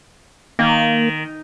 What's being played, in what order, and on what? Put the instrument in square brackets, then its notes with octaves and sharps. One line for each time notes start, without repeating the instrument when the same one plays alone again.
[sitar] D#3 [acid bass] A#3